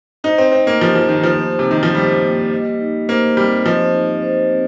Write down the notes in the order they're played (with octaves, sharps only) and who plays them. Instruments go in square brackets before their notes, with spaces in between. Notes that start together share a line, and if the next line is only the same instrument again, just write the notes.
[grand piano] D#4 [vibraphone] C5
[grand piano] C4
[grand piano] C4 [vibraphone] D#4
[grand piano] A#3
[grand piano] F3 [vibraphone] G4
[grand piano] F3
[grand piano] D#3 [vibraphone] A#3
[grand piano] F3
[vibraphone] C5
[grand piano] C3
[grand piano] D#3 [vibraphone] D#4
[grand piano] F3
[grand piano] G3 [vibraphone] G4
[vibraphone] A#3
D#5
D#4
[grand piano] A#3 [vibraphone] C5
[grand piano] G3 [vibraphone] C4
[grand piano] F3 [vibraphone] D#5
[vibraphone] D#4
C5
C4